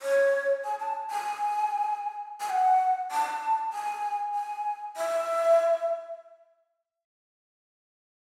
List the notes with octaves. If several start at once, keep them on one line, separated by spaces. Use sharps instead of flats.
C#5
G#5
A5
G#5
G#5
F#5
A5
G#5
G#5
E5